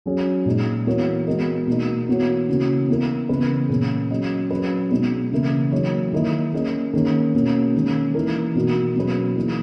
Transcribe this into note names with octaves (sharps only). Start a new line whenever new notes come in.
F#3 C#4 G#4
A#2 G#3 D#4
E3 B3 F#4 A#4 C#5
G#3 B3 F#4 A#4 D#5
B2 A#3 D#4
E3 B3 F#4 C#5
C#3 E3 A#3 C#4 F#4
B3 E4 A#4
C#3 E3 B3 E4 B4
A#2 A#3 C#4 G#4
F#3 C#4 G#4 D#5
F#3 C#4 G#4 B4
B2 G#3 B3 D#4 G#4
C#3 E3 A#3 E4 A#4
F#3 A#3 D#4 G#4 C#5
D#3 A#3 E4 A#4 D#5
A#3 C#4 G#4 D#5
D#3 A#3 C#4 G#4
B2 A#3 C#4 F#4
D#3 G#3 C#4
E3 A#3 D#4 A#4
B2 A#3 D#4 F#4
B2 F#3 C#4 G#4 B4
E3 A#3 D#4 G#4